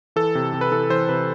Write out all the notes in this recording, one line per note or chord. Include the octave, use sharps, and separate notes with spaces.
E3 A4
C3
C3
B4
E3 A4
E3 C5
C3 B4